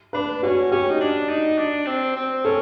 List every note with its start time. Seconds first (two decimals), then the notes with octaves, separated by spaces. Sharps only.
0.13 D4 B4
0.43 C#4 F#4
0.72 C#4 G4
0.90 D#4
1.01 D4
1.29 D#4
1.58 D4
1.86 C4
2.16 C4
2.44 C#4 A4